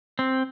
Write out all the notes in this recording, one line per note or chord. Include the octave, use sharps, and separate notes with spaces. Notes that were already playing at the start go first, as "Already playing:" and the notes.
C4